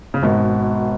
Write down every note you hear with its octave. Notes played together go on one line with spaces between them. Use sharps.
C#3
G#1 B2